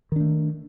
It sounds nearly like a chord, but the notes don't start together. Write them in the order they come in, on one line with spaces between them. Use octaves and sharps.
D#3 D4 A3